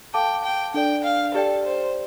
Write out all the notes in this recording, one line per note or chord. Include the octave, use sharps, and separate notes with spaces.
A4 F5 G5 A5 D6
G5
D4 A4 D5 G5
F5
G4 A4 D5 G5
C5